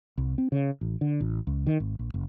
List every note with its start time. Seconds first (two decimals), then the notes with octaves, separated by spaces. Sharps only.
0.18 C2
0.38 C4
0.52 C#3
0.81 A1
1.01 D3
1.21 A1
1.47 C#2
1.67 D#3
1.80 G#1
1.99 A#1
2.14 F#1